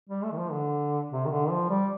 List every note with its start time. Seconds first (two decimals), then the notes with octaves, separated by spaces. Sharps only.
0.09 G3
0.23 A3
0.32 D#3
0.38 F3
0.52 D3
1.12 C3
1.25 D#3
1.30 D3
1.50 F3
1.69 G3